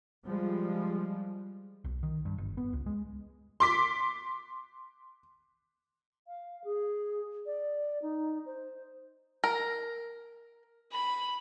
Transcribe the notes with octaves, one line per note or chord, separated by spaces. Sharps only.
F3 G3 G#3
B1
D#3
G2
G1
B3
C#2
G#3
C6 D6 B6
F5
G#4
D5
D#4
C5
A#4
B5